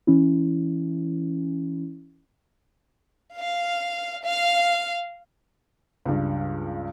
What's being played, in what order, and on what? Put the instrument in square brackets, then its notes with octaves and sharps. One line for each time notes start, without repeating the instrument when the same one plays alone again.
[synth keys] E3 C#4 E4
[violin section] F5
F5
[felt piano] C#2 G2